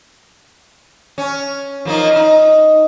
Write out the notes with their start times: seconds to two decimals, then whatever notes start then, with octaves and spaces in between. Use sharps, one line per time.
1.18 C#4
1.85 F3 A#3 D#4
2.16 D#4